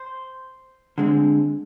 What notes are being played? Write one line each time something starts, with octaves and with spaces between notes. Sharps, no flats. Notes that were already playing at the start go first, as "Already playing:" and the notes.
Already playing: C5
D3 G#3 C4